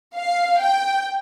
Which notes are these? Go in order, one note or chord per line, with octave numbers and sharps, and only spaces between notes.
F5
G5